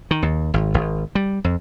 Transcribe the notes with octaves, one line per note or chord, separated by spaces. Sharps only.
D#3
D#2
G#1
G#1
G3
F2